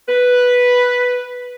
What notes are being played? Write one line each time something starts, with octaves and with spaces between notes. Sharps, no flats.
B4